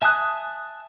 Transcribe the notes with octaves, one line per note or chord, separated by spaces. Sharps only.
E5 G#5 A5 D#6 F#6